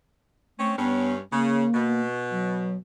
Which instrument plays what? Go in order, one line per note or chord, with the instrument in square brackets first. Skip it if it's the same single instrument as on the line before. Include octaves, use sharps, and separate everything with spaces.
[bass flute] A3 [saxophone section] C4 C#4 C#5
[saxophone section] G2 C#4 [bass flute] B3
[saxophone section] C#3 [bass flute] A#3
[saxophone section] B2
[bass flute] F#3